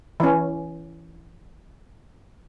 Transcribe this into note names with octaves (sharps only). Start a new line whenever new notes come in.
E3 C#4